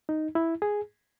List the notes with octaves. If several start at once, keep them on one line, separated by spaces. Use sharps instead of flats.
D#4
E4
G#4